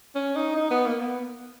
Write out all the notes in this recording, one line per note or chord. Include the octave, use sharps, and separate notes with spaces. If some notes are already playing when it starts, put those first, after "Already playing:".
C#4
D#4
D#4
B3
A#3
B3